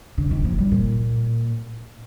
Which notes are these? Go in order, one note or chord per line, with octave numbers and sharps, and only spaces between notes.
D3
D#3
F3
G3
A#2